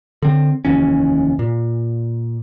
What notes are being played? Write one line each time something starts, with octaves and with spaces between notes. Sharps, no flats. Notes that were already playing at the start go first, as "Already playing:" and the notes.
D3 C4
F1 D#2 E3 C#4
A#2